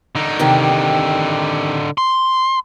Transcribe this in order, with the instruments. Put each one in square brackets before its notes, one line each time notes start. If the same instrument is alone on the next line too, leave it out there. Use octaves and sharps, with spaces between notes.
[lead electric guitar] D3 D#4
[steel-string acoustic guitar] C3 D#3 G4
[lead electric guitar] C6